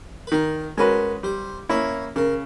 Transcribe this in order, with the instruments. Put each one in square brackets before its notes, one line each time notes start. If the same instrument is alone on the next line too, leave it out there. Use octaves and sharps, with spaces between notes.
[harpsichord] B4
[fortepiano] D#3 [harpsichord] A#4
[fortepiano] G#3 C#4 F#4 B4 [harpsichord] A#4
[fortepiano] G3 [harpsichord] C5
[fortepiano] A#3 C#4 E4 [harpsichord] C#5
[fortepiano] C#3 [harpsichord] A#4